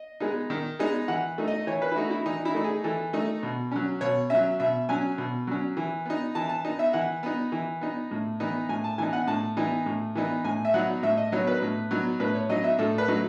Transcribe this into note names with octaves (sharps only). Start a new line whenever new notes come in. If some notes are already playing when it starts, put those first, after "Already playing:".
Already playing: D#5
G#3 B3 D#4
D#3
G#3 B3 D#4
E3 F#5
A3 D#4
D#5
E3 C#5
B4
E4
A3 D#4 F#4
E4
E3 D#4
E4
A3 D#4
G#4
E3 A4
A3 D#4
B2
F#3 C#4
B2 C#5
F#3 C#4 E5
B2 E5
F#3 C#4 G#5
B2
F#3 C#4
E3
B3 D#4
E3 A5
A5
B3 D#4
E5
E3 F#5
B3 D#4
E3
B3 D#4
A2
E3 B3 D#4
A2 G#5
A5
E3 B3 D#4 G#5
F#5
A2 A5
E3 B3 D#4
A2
E3 B3 D#4
A2 G#5
E5
F#3 B3 D#4 F#5
A2 E5
D#5
F#3 B3 D#4 C#5
B4
A2
F#3 B3 D#4
A2 B4
C#5
F#3 B3 D#4 D#5
E5
A2 A4
B4
F#3 A3 D#4